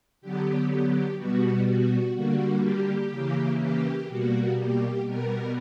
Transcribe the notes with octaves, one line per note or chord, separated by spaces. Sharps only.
D3 F#3 B3 G4
G4
B2 G3 B3 F#4
F#4
D3 G3 A#3 F#4
G4
C#3 E3 A#3
G4
B2 G3 A#3 F#4
G4
B2 G3 B3 A#4